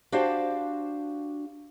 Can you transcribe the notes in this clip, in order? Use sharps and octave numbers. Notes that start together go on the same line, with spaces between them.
D4 F#4 G4 C5 F5